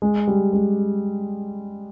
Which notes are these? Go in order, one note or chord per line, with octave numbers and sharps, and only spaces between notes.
G#3
G3
G#3